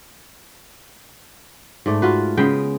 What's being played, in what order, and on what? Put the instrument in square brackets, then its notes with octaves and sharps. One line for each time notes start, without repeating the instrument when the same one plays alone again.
[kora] G#2 A3 D5
F4 F#4 B4
C#3 G#3 B3 G5